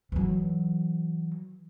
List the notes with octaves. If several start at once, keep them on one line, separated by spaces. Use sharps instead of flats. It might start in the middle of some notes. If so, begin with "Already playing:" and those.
E3 F#3